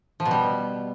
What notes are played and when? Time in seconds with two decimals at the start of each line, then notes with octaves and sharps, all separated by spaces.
0.20 F3
0.25 B2
0.31 G3